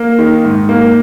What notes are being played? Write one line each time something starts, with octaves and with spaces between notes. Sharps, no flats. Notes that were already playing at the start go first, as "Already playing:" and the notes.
Already playing: A#3
D#3
G#2
A#3